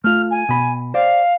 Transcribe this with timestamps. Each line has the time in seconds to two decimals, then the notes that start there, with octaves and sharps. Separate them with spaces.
0.04 A3 F4 F6
0.31 G#5
0.49 B2 B5
0.94 C5 D5 F5